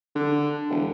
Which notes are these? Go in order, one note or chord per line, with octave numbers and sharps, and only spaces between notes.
D3
E1